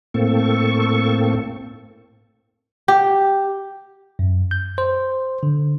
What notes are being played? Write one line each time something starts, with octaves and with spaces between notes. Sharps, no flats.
A2 A#3 C4 A4 C#6
G4
F#2
G6
C5
D3